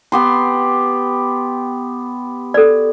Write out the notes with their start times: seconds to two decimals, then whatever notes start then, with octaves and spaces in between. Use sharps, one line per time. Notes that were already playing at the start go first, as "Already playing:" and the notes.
0.12 B3 G4 C6
2.54 A4 D5